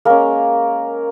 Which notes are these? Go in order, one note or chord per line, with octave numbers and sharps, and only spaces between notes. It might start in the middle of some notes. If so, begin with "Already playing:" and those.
G#3 A#3 C#4 A#4